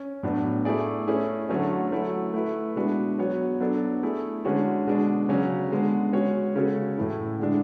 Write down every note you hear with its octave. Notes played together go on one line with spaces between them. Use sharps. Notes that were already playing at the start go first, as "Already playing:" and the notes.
Already playing: C#4
A2 F#3 B3 D4
A3 E4 G#4 D5
A3 C#4 E4 G#4
D3 F#3 A3 C#4
F#3 A3 E4
A3 E4 B4
B2 G#3 D4 F#4 B4
F#3 B3 F#4 C#5
F#3 B3 D4 A4
A3 E4 G#4
D3 G#3 C#4 F#4
B2 G#3 B3 D4
C#3 F#3 C#4
D3 G#3 B3
G#3 C#4 F#4 C#5
C#3 G#3 C#4 F#4 A4
A2 E3 A3 E4
D3 G#3 D4